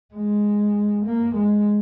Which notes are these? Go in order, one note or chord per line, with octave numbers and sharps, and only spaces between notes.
G#3
A#3
G#3